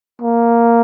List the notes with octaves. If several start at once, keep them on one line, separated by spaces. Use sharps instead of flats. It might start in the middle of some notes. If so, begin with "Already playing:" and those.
A#3